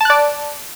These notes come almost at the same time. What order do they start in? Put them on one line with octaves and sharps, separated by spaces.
A5 F#6 D5